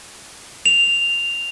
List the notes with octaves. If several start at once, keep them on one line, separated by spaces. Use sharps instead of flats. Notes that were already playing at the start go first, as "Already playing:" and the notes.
F7